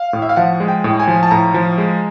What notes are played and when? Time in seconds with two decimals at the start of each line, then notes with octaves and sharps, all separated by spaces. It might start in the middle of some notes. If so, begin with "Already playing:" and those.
Already playing: F5
0.13 A2
0.22 E5
0.29 F5
0.36 F3 F#5
0.60 G#3
0.68 G5
0.84 A2
1.00 G#5
1.08 F3
1.23 A5
1.31 A2 A#5
1.54 F3
1.78 G#3